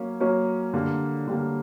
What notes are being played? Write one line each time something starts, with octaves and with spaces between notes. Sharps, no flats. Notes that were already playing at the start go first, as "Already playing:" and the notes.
Already playing: F#3 A#3 C#4
F#3 A#3 C#4
D3 G3 A#3
D3 G3 A#3